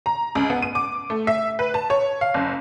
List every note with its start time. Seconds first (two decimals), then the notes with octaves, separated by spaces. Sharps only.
0.06 A#5
0.35 C#2
0.50 B3
0.62 D#7
0.75 D6
1.10 A3
1.27 E5
1.59 B4
1.74 A5
1.90 C#5
2.21 F5
2.34 F#1